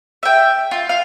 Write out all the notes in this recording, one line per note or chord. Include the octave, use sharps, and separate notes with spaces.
E5 G5
F4
F5